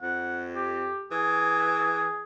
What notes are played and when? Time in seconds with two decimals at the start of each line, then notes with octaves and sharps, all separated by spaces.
0.02 F2 F#5
0.56 G4
1.12 E3 G#4